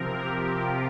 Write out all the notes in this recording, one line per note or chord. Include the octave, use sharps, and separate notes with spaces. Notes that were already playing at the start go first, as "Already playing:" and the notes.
Already playing: C3 F3 C4 A#4
G4
F4